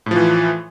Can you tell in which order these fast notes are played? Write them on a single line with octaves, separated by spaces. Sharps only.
A2 F3 E3